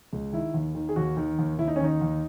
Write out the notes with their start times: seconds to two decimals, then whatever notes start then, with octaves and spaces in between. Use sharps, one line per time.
0.13 C#2
0.33 D#3 E4
0.54 D#2
0.75 D#3
0.89 G#4
0.96 D#2 F#4
1.17 D#3
1.39 D#2
1.59 D#2 E4
1.68 D#4
1.76 C#4
1.80 D#3 D#4
2.01 D#2